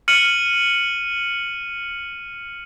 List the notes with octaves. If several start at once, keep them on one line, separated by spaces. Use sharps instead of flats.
F6 C#7 D#7 F#7